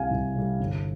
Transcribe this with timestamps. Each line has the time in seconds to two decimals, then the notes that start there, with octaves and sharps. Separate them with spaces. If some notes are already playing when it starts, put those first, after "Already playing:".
Already playing: C2 C3 G3 F5 G#5
0.11 C2
0.35 C3 G3
0.59 G1